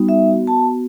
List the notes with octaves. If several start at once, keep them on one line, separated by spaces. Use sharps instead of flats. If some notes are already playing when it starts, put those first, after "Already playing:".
Already playing: G3 B3 D#4 F#4
E5
B3 F#4
A5